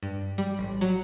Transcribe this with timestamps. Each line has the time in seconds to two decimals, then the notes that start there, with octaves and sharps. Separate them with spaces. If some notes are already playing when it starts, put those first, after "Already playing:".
0.03 G2
0.38 G3
0.59 A1
0.81 F#3